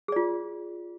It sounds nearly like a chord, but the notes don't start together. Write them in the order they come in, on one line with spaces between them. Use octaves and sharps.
G#4 D5 F4